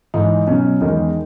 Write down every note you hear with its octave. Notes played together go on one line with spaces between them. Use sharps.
G#2 E3 G#3 D#4
B2 F#3 C#4
E2 D#3 G#3 D#4